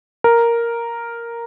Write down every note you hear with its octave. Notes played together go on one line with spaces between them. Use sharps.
A#4